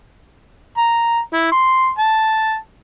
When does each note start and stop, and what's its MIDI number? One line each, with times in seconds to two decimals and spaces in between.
0.77 1.19 82
1.33 1.51 64
1.52 1.90 84
1.98 2.56 81